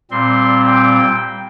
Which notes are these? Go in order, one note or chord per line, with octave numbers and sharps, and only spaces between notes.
A#2 G3 C4 C6
G5